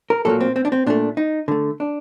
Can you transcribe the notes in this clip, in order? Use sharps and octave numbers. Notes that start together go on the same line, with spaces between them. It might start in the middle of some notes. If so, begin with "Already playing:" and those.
A#4
A#2 F#3 A#3 A4
C4
C4
D4
C4
A#2 A3 D4
D#4
D3 A3
D4